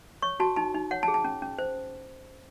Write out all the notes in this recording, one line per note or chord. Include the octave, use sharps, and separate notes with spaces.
C#5 C#6
F#4 A5
D#4 A5
D#4
C#5 F#5
A5
G#4
A5
C#4
C#4
C5